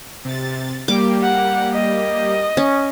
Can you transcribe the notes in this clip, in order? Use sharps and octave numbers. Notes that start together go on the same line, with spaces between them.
C3 A6
G3 A#3 G4 D6
F#5
D#5
C#4